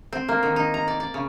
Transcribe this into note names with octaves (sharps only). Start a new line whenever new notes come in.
C4
A#3
D#3
D#4
A#5
D5
D5
C#3